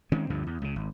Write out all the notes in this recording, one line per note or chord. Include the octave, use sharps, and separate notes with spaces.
D#3 G#3 C4 C#4
D2 G2 D3 F3
E2
C#2 C#3
G#1